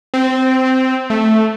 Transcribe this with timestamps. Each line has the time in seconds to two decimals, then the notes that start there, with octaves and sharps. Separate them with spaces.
0.14 C4
1.10 A3